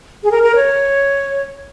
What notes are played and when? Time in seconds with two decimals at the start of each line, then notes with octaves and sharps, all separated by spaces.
0.23 G#4
0.31 A#4
0.43 A#4
0.55 C#5